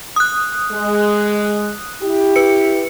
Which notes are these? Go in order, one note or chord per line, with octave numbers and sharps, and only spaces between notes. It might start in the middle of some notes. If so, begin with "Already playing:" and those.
D#6 F#6
G#3
E4 G4
B4 C#7